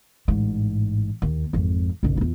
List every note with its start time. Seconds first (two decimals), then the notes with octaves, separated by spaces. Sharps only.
0.28 A1 G#2
1.22 D#2
1.53 G#1 F2
2.03 F#1 B1
2.17 E2 F4